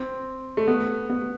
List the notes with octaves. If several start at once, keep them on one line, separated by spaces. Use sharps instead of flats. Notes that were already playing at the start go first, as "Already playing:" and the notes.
Already playing: C4
A3
B3
B3